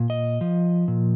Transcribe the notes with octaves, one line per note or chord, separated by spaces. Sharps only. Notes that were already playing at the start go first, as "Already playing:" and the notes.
Already playing: A#2
D#5
F3
A#2